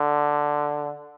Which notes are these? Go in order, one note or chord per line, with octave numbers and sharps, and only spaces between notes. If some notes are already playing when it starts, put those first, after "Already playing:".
Already playing: D3